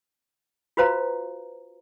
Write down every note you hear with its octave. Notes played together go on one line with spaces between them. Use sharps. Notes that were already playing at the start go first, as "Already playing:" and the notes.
F4 F#4 B4 C5 F5 A#5